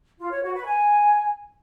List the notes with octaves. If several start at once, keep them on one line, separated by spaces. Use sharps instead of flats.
F4
C#5
F#4
B4
G#5